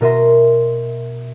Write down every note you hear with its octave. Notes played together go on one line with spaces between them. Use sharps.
B2 A#4 D#5 E5 C6 A#6